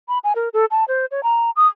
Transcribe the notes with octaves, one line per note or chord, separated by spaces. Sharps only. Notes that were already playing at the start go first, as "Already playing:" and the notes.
B5
G#5
A#4
A4
A5
C5
C#5
A#5
D#6